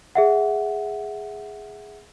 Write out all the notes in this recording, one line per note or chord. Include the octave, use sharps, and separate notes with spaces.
G#4 E5 F#5